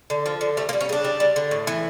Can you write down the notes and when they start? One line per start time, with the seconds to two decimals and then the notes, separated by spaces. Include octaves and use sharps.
0.10 D3
0.26 F3
0.41 D3
0.57 G3 A3
0.69 A#3
0.73 G3
0.81 C#4
0.89 C#3 D4
1.05 G3
1.20 G3
1.36 D3
1.51 A2
1.67 E3